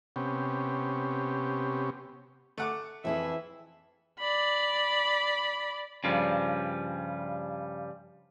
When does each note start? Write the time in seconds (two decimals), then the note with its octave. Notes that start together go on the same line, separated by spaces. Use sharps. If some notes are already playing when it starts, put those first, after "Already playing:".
0.16 C3 B3 C#4 G4
2.58 A3 F#5 D6
3.05 F2 E3 E4 G#4 E5
4.19 D5 B5
6.04 G2 C#3 F3 G3